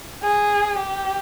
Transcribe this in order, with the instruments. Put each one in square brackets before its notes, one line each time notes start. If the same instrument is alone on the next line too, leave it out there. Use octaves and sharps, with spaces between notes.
[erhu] G#4
G4